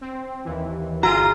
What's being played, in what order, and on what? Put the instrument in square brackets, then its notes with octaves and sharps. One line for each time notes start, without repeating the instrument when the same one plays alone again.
[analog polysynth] C4
D#2 E3
[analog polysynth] G1 D#7 [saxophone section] F4 [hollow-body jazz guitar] F#4 G#4 [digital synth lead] A#5